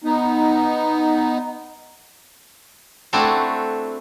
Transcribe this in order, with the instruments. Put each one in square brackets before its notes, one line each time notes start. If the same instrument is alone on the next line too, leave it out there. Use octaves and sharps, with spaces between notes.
[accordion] B3 D#4
[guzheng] A3 C4 D4 E4 F#4 A4